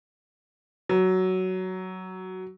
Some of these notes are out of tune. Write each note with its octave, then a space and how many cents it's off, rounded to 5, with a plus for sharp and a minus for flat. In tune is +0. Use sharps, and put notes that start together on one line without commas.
F#3 +10